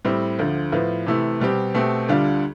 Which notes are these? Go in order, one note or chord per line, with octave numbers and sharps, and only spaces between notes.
A2 G3 C4
D2 D3 F3
A2 F3 B3
C3 E3 A3 E4
B2 G3 C4 G4
B2 A3 C4 G4
D2 D3 G3 D4 F4